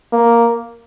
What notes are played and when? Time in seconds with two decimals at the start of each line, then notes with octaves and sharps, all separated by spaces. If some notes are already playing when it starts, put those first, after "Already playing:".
0.13 A#3